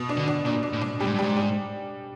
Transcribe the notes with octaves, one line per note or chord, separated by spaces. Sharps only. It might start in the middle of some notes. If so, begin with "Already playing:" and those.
Already playing: B2
D4
D3
D4
A#2 D4
D4
A2
D4
A2 G3
G#2
G2
G#2 G3
G3